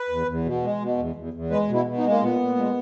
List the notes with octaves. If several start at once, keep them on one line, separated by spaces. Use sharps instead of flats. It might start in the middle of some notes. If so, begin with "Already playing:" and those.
Already playing: B4
E2
E2
B2
G#3
B2
E2
E2
E2
G#3 B4
B2
E4
B2
D#4
G#3
A#3
A#2 B3
A#2
G#3